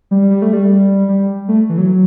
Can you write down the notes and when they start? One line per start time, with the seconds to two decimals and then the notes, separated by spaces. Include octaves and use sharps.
0.11 G3
0.31 G3
0.42 A3
0.53 G3
1.09 G3
1.48 A3
1.69 E3
1.78 F#3